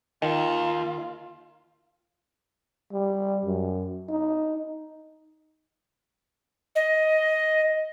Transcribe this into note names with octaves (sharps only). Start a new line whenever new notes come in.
D#2 D#3 F4
G3
F#2
D#4
D#5